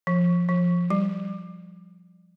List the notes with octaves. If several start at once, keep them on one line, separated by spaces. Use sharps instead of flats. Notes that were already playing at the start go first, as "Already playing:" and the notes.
F3
F3
G3